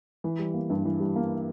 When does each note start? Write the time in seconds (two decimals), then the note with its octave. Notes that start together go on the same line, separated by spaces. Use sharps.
0.24 E3
0.39 G3
0.54 A#3
0.70 G2
0.85 E3
1.00 G3
1.16 A#3